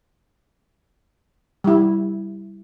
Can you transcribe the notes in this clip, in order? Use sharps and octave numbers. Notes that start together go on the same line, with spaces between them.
G3 E4